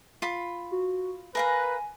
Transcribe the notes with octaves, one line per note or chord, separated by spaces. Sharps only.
F4 B5
F#4
A#4 B4 F5 G#5 A#5